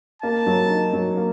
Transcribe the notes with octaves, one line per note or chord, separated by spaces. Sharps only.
A#3 A5
F#3
D#4
F#3
A#3